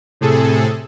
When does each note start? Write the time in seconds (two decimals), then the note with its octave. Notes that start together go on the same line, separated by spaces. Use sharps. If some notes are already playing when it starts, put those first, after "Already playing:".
0.21 A2 C3 G#4 A4